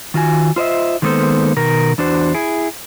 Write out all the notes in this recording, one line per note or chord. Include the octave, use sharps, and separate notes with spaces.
D#3 F4 F#4 G#5
F4 C5 D#5 E5
D#3 G#3 A#3 B3 A4 C5
B2 D#3 A#4
E2 D4 F#4 C5
E4 G#4